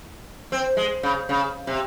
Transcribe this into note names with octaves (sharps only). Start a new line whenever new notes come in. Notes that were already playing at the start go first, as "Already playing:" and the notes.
C4
G#3
C#3
C#3
C3